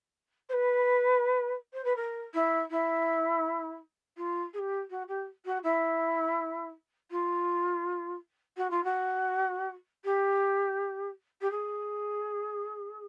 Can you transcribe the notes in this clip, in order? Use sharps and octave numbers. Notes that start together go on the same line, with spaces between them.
C5
B4
C5
B4
A#4
E4
E4
F4
G#4
G4
F#4
G4
F#4
E4
F4
F#4
F4
F#4
G4
G4
G#4